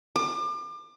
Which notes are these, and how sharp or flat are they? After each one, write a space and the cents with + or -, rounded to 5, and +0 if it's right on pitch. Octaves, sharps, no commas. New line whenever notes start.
D6 +35